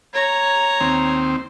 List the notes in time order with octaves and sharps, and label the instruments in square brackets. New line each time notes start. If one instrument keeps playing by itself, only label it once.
[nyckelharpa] C#5 A#5
[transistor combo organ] D#2 C4